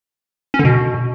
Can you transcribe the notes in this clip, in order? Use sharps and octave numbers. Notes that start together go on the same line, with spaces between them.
C#4
D3
B2